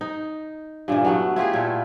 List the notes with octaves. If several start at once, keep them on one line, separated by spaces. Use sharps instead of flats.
D#4
G2 A#2 C#3 E3
F#3 A3 B3
E4 F4 G4 G#4
A#2 A3